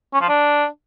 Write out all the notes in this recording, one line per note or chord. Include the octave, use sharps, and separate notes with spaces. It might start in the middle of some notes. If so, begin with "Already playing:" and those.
C#4
F3
D4